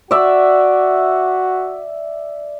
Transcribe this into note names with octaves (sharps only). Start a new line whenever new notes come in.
F#4 D5 E5